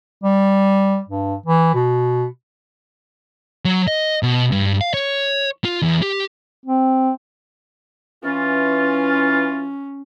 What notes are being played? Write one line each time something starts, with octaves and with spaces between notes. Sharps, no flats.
G3
G2
E3
B2
F#3
D#5
B2
G2
F5
C#5
F4
E2
G4
C4
E3 C#4 F4